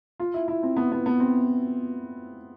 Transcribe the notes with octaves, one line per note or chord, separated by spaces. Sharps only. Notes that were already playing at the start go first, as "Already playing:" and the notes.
F4
E4
E4
C4
B3
B3
B3
C4